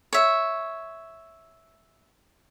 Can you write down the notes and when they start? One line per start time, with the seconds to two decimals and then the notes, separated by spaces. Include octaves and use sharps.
0.13 C#5 E5